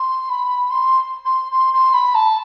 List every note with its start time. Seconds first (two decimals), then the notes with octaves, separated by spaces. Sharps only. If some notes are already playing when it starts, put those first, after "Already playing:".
Already playing: C6
0.29 B5
0.70 C6
1.25 C6
1.52 C6
1.74 C6
1.94 B5
2.15 A5